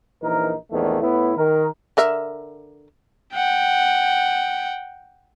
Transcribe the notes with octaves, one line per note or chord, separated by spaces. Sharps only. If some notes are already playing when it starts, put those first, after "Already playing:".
A#1 E3 D#4 A#4
A#1 E2 D#3 A3
A2 B3 E4
D#3 A#4
D3 A#4 E5
F#5 G5